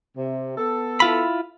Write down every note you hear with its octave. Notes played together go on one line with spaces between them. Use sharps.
C3
B3 A4
E4 F4 B5